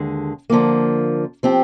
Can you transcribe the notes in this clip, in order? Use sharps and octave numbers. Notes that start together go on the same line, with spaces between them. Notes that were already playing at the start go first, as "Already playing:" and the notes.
Already playing: D#2 D3 G#3
D3 F3 A#3
F3 C4 G4